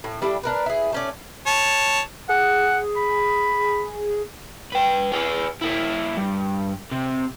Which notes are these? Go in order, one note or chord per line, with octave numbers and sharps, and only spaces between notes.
A2
G3 D4 E4 A4
D4 A#4 B4
E4 G#4
A3 C#4 D5
C#5 A5
G#4 F#5
B5
B4 G5
G#4 B4
A#3 E4
G2
C3